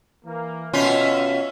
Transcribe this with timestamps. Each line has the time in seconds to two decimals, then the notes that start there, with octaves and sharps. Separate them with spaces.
0.25 E3 A#3
0.73 B2 C#4 F4 C#5 E5